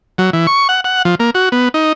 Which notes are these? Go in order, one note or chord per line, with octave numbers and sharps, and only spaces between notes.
F#3
E3
C#6
F#5
F#5
F3
A#3
F#4
B3
D#4